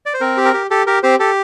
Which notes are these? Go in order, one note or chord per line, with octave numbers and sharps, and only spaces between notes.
D5
C5
C4 A#4
G4
A#4
G4
G4 A4
G4 A#4
C4 G4 C5
G4 A4